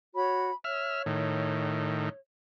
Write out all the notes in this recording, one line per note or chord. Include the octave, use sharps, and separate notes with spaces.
F#4 C#5 B5
C#5 E5 F6
A2 D#3